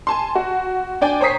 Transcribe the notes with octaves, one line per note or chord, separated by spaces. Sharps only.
G#5 A5 C6
F#4
D4 D5 G5 G#5
C5 C#5 A#5 D#6 B6 C7